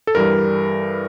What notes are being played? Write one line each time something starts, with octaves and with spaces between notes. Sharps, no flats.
A4
G2 E3 G3 A#4